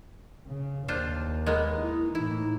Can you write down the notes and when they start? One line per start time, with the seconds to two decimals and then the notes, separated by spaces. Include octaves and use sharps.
0.46 C#3
0.88 D#2 D4 F4 C5
1.46 G#3 A#3 B3
1.81 D#4 E4
2.15 A2 E3 D#4 E4